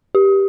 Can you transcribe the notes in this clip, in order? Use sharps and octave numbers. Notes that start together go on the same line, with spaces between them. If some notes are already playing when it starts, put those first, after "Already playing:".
G4